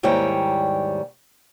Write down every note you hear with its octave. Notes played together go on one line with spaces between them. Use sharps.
D#2 G#2 G3 E4 C#5 G5